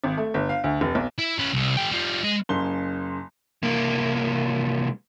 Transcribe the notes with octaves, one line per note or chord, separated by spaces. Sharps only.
G#1
A3
G1
F5
D2
F1
B1
E4
C#4 B4
C2
G#3 G5
G3 F4
G#3 D#5
F#1 C#3 C6 G7
C2 A#3